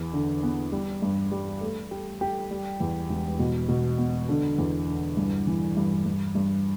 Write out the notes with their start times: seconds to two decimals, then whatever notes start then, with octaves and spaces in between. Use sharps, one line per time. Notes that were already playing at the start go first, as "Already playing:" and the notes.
Already playing: E2
0.13 D3
0.43 B3
0.72 G3
1.02 G2
1.31 G3
1.61 A3
1.91 G4
2.21 G4
2.51 G3
2.80 E2
3.10 E1
3.39 B2
3.68 B2
3.98 B3
4.29 D3
4.58 E2
4.87 D3
5.17 G2
5.47 E3
5.77 G2
6.06 G2
6.35 G2